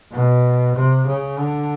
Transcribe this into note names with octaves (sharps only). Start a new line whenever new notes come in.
B2
C3
C#3
D3